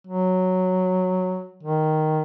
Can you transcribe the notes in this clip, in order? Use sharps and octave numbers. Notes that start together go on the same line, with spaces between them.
F#3
D#3